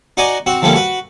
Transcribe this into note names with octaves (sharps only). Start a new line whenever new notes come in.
D#4 F#4 D5 D#5 G#5 A#5
C4 F#4
D3 F3 G3 A3 A#3 C#4
F#4 B4